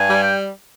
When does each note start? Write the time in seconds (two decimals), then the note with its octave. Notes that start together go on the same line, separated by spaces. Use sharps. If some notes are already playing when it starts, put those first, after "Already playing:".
Already playing: G2 G#5
0.09 G3
0.23 G5